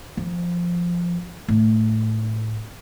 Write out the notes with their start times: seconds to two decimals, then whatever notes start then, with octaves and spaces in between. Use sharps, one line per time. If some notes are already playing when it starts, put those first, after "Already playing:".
0.17 F3
1.48 A2